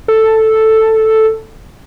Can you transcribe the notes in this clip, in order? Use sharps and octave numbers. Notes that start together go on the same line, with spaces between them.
A4